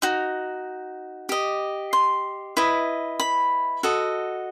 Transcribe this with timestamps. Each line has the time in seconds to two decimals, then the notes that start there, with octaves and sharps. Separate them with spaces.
0.02 D#4 F#4
1.29 G4 D#5
1.93 C6
2.57 E4 B4 D#5
3.20 B5
3.83 F#4 A4 D#5